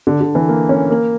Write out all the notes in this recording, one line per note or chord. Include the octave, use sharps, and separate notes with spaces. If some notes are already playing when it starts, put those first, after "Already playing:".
D3
D3
E3
A#3
C#4
A#3